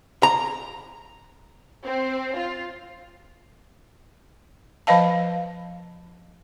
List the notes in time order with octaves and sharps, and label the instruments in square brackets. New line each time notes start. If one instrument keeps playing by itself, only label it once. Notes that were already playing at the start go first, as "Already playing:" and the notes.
[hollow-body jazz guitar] A#5
[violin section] C4
F4
[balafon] F3 B4 D#5 F5 A5